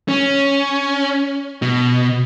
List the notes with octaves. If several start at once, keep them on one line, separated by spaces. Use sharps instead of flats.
C#4
B2